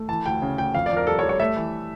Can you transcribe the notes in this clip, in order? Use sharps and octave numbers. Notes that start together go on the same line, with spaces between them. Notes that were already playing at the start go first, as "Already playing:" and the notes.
Already playing: A3
E3 A5
D2 G5
C#3
D2 G5
F2 F5
D5
F2
A#4
G3 A4
C#5
G3
C#5
A3 E5
E3